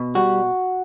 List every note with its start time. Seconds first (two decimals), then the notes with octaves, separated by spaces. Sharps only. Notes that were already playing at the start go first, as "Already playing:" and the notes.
Already playing: B2
0.15 G3 F#4